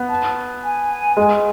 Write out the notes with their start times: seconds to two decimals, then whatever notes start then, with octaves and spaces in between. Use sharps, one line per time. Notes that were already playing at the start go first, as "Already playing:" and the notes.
Already playing: B3
0.10 A5
0.64 G#5
1.17 G#3